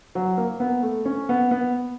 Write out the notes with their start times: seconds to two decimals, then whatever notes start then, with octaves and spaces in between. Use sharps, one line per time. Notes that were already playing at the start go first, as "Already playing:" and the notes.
0.15 F#3
0.37 A#3
0.60 B3
0.83 A3
1.05 C#4
1.29 B3
1.51 B3